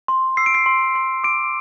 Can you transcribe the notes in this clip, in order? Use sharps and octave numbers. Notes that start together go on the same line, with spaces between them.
C6
E6 C7
D7
C7
C6
C6
D6 D7